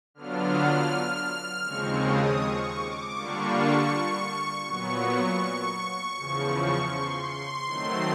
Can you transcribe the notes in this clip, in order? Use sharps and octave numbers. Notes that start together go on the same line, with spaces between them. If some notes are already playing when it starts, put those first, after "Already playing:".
D3 F#3 B3 D4 F4 F6
D#2 C#3 F3 G#3 C4 C#6
D#6
C#6
D6
D3 G3 A#3 D4 F4 C#6
A#2 F#3 B3 C#6
E2 C#3 F3
C6
D#3 F#3 A3 C4